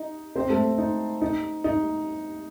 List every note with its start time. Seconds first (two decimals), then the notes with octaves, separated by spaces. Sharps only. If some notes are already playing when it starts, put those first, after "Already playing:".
Already playing: D#4 D#5
0.36 C4 C5
0.50 A3 A4
0.78 D#4
1.22 D#4
1.64 D#4